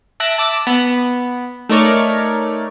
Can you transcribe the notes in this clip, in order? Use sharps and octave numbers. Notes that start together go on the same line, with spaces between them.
E5 A5 F#6 A#6 D7
A5 D6 E6
B3
A3 D#4 A#4 C#5 D5